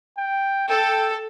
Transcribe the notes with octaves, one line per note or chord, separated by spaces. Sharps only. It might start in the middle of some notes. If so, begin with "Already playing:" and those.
G5
A4 G5